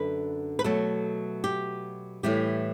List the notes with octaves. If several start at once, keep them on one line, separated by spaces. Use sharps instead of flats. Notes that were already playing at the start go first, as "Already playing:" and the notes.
Already playing: F#2 D3 A3 B4
B4
B2 F#3 A3 A4
G4
A2 E3 G3 G4